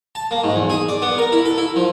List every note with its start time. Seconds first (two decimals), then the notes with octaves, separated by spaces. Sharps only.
0.15 A5
0.31 A#3
0.44 G#2
0.56 E2
0.70 G#4
0.88 D5
1.02 B3
1.18 A#4
1.32 E4
1.46 A4
1.58 E4
1.76 F3